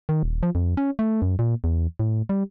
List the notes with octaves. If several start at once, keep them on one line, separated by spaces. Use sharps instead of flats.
D#3
D#1
F3
F2
C#4
A3
F#2
A#2
E2
A2
G3